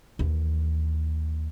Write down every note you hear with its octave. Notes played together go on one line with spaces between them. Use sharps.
D#2 E3